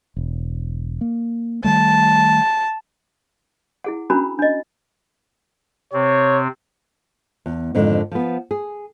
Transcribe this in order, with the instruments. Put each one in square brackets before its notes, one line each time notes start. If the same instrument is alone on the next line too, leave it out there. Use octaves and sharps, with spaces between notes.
[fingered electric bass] E1
A#3
[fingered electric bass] D#3 G3 A3 [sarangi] A5
[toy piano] E4 G#4 F#5
C#4 D4 F#4 A#4 A#5 B5
D4 D#5
[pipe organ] C3 C4 [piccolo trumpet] C#5
[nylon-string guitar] E2
F2 G#2 D3 D#3
F3 B3
G#4